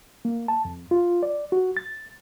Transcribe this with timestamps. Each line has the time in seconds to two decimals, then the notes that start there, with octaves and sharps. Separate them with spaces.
0.25 A#3
0.48 A5
0.65 F2
0.91 F4
1.23 D5
1.52 F#4
1.77 A6